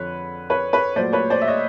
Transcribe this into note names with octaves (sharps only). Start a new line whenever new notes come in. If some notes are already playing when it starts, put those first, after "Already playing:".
Already playing: F2 D3 F3 B4 C#5
B4 C#5
B4 C#5
A#2 F#3 A3 C5 D5
B4 C#5
C5 D5
E5
C#5 D#5